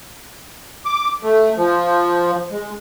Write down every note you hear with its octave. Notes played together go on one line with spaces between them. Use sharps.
D6
A3
F3
G#3